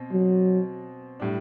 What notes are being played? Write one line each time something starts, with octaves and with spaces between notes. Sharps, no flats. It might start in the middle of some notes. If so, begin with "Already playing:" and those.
Already playing: B2 C4
F#3
A2 G3 D4